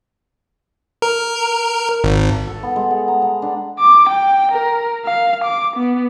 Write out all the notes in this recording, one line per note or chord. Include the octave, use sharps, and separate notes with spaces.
A#4
G#1
A4
B3
G#3
F#5
A#5
F#5
D4
D6
G5
A#4
F5
D6
B3